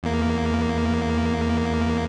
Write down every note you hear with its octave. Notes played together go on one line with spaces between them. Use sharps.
E2 A#3